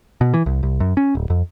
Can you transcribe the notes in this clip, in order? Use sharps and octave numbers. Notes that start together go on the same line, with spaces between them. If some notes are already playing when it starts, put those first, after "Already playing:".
B2
E3
C2
C2
F#2
C#4
D1
F2